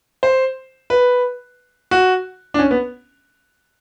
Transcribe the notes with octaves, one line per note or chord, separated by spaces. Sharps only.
C5
B4
F#4
D4
C#4
B3